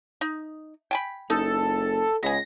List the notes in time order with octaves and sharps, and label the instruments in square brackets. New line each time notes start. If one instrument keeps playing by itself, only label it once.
[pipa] D#4
G5 G#5 B5
[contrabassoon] F#1 [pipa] D#4 [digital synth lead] A4
[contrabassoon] C#2 [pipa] B3 G#4 [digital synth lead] A#6